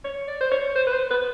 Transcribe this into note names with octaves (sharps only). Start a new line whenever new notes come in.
C#5
D5
C5
C#5
C5
B4
C5
B4